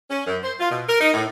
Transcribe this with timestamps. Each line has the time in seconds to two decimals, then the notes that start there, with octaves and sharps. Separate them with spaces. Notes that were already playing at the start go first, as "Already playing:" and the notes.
0.09 C#4
0.27 F#2
0.42 C5
0.58 F4
0.70 B2
0.87 A#4
1.00 D#4
1.13 A2